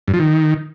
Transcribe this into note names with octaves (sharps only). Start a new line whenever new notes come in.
G2
F3
D#3